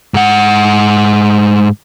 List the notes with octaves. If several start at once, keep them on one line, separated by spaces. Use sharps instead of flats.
G#2 F#5